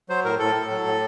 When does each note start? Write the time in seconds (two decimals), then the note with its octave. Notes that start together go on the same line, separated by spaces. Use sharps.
0.09 F#3 C5
0.24 A2 A#4
0.39 A2 A4
0.55 A2
0.70 F#3
0.85 A2